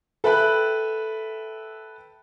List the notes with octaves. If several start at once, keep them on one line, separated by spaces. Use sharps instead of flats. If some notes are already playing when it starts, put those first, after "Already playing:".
A4 B4 E5 G5 B5 F#6